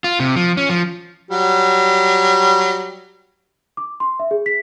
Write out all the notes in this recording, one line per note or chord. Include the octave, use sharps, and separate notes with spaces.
F4
C3
F3
C#4
F3
F#3 G3
D6
C6
E5
G#4
B6